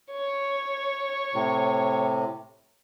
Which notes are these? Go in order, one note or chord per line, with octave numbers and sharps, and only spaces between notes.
C#5
A2 C3